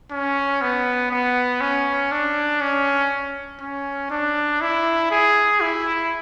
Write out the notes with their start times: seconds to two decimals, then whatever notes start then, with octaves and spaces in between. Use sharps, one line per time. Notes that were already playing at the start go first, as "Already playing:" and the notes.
0.11 C#4
0.62 B3
1.11 B3
1.61 C#4
2.11 D4
2.61 C#4
3.61 C#4
4.10 D4
4.61 E4
5.11 G#4
5.61 E4